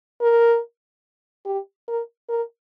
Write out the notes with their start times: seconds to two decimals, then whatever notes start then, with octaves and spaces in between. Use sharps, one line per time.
0.21 A#4
1.46 G4
1.88 A#4
2.29 A#4